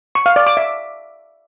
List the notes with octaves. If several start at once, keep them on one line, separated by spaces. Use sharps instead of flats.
C#6
F5
D5
D6
E5